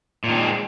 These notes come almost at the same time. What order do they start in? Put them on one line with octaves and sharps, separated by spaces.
A#2 D#3 C4 G#3